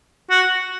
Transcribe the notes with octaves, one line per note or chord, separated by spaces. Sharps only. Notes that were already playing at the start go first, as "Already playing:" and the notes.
F#4